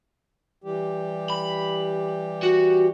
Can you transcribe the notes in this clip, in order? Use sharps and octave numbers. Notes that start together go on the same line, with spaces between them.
E3 G3 G4
B5
F#4